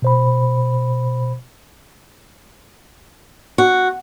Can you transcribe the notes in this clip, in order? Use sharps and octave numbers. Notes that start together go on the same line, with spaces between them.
B2 C5 B5
F#4